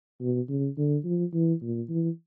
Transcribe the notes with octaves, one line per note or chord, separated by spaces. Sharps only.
B2
C#3
D3
F3
E3
A#2
E3